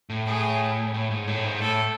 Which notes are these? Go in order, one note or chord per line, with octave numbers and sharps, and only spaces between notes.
A2
A2 G#4
A2
G#2
A2
G#2
A2 A4